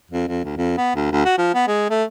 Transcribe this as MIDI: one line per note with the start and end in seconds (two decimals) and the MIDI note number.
0.11 0.28 41
0.28 0.42 41
0.44 0.57 38
0.57 0.73 41
0.77 0.91 59
0.95 1.08 38
1.12 1.25 38
1.25 1.34 66
1.38 1.54 53
1.54 1.67 59
1.67 1.90 56
1.90 2.04 57